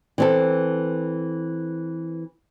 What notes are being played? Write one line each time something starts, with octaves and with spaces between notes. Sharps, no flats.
E3 C4 A4